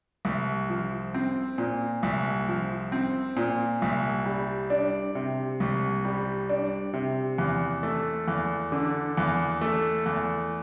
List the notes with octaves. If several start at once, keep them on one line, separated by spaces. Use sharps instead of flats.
C2
F3
C4
A#2
C2
F3
C4
A#2
C2
G3
D4
C3
C2
G3
D4
C3
E2
A3
E2
D3
E2
A3
E2